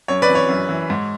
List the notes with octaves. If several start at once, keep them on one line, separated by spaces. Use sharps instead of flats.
F#2 C#5
B4 D5
E3
C#5
F#2
E3
G#2